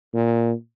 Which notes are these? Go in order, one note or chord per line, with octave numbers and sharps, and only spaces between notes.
A#2